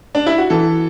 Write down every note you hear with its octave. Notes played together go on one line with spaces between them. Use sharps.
D4
E4
F#4
E3 A4